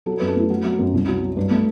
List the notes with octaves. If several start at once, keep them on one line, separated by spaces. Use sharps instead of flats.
F#3 A4
B4
F#2
A4
A3 E4
F#3 F#4
F#3
F#2
C2
F#3
F#3
G2
A3